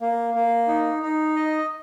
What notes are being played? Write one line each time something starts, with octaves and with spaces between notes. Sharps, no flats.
A#3
A#3
D#4
D#4
D#5